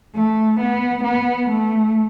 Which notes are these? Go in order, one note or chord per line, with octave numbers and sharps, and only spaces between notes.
A3
B3
B3
A3